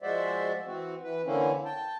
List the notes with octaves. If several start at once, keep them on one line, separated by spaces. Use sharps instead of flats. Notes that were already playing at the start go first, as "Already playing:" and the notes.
F3 G#3 F#4 C5 D5 E5
E3 C4 F#4
E3 B4
D3 E3 A#3 C4 C#4 E4
G5 A5